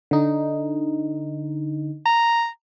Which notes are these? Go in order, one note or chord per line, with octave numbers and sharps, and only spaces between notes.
D3 D#4
A#5